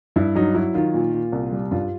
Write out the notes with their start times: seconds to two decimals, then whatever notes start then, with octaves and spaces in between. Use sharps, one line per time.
0.16 G2 E4
0.35 F#3 D#4
0.54 F#3 E4
0.74 D#3 F4
0.94 A#2
1.14 A#2
1.32 C2
1.52 G3
1.71 G2 F4